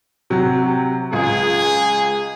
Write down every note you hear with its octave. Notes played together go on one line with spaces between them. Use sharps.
C3 F#3
C#2 G#4